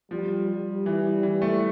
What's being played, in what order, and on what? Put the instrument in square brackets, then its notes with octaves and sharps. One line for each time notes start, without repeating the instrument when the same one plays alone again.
[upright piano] F3 [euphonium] G3
[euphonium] G3
[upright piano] E3
E3
A3